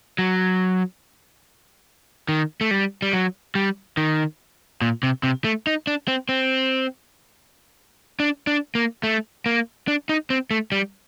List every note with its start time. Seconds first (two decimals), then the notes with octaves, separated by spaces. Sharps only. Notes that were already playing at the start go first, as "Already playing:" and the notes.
0.19 F#3
2.29 D#3
2.61 A3
2.71 G3
3.02 G3
3.13 F#3
3.55 G3
3.97 D#3
4.82 A#2
5.03 C3
5.23 C3
5.44 A3
5.67 D#4
5.87 D4
6.08 C4
6.29 C4
8.20 D4
8.47 D4
8.75 A#3
9.03 A3
9.46 A#3
9.88 D4
10.09 D#4
10.30 C4
10.51 A3
10.72 G3